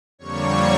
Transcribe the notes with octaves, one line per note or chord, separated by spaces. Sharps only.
F2 D3 G3 A#3 C#5 C#6